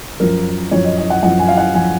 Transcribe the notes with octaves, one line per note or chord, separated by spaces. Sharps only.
F#2 F3 A#4
F#2 F3 C#5
D#5
D#5
F#5
F#2 F3 F#5
G#5
F5
F#5
F3 G#5